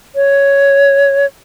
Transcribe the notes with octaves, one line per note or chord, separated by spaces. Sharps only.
C#5